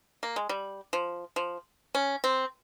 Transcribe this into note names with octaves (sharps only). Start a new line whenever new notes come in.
A#3
G#3
G3
F3
F3
C#4
C4